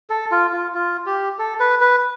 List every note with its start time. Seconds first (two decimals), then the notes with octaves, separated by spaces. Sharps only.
0.10 A4
0.32 F4
0.53 F4
0.74 F4
1.06 G4
1.39 A4
1.60 B4
1.81 B4